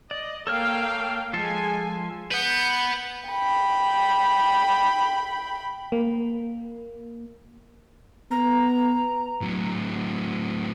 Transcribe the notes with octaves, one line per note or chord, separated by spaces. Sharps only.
D5 D#5
A#3 A4 C#5 F5 G5 F6
F3 G#3 F4 A4 G#5
B4 F#5 G6 C#7
G5 B5
A#3
B3 A#5
A2 F#3